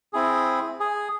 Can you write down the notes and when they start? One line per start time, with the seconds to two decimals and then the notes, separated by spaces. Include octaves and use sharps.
0.13 C4 E4 G#4
0.80 G#4